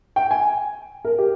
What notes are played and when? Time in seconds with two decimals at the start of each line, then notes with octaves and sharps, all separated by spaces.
0.16 G5
0.31 G#5
1.05 A#4
1.18 G4